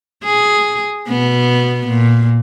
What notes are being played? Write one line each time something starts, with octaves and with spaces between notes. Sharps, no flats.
G#4
B2 B3
A#2